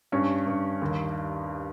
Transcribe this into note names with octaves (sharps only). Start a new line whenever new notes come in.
G2 C#4
G2
D#2